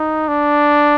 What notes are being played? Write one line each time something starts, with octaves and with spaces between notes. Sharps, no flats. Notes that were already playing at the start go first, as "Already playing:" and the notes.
Already playing: D#4
D4